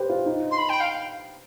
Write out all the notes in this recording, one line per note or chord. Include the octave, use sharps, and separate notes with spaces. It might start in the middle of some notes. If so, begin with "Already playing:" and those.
Already playing: G4 B4 C5
F4
D#4
C6
B5
G5
F5